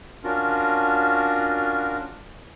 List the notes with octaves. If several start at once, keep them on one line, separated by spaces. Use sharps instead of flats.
C#4 D4 F4 F#4 A#4